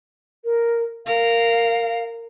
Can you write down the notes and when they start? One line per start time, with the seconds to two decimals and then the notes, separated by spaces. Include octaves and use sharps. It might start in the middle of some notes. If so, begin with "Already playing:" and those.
0.45 A#4
1.06 A#4 F5